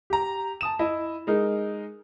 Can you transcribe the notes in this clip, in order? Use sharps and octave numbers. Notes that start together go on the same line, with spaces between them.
G4 A#5
A5 D#6 E7
E4 D#5
G#3 D#4 A#4